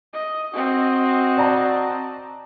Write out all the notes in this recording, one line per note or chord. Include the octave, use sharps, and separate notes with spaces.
D#5
C4 F#4 D#5
D5 A5 A#5